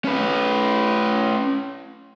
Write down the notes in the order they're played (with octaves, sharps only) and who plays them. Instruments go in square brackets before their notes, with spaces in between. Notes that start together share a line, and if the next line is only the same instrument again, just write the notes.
[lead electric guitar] C#4 B4